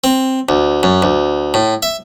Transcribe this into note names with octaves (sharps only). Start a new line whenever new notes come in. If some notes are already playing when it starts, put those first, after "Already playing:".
C4
D2
F#2
D2
A2
E5